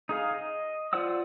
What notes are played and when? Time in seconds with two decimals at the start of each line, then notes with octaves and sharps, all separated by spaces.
0.09 D#4 G#4 F5
0.34 D#5
0.93 F4 C5 D5 F#5 E6